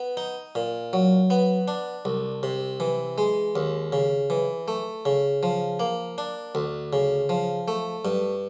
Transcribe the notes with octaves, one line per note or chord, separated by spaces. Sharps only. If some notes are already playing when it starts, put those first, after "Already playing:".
Already playing: B3
D#4
A#2
F#3
B3
D4
C2
C3
E3
G#3
D#2
C#3
E3
A3
C#3
F3
A#3
D4
D2
C#3
F3
A3
G2